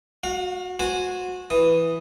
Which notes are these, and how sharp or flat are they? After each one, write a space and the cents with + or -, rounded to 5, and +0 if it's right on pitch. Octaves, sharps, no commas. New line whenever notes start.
F#4 -20 F5 +30
F#4 -20 C5 -5 G#5 +0
E3 +0 D#6 +0